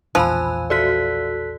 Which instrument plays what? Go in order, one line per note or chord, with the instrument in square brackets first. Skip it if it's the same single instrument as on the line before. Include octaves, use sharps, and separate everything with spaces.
[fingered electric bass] E1 A#1 E2 [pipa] F3 [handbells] G#5 [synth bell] B5 E6 F#6
[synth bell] F#4 D5 [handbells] A4 F#6 B6